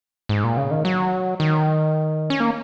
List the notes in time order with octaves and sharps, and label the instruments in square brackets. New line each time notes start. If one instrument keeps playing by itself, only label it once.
[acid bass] G#2
A#2
C#3
D#3
F#3
D#3
C#4
A#3